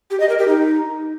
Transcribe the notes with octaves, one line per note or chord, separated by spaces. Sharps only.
G4
D#5
A#4
G4
D#4